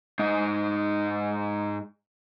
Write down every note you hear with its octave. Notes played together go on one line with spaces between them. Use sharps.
G#2 D#4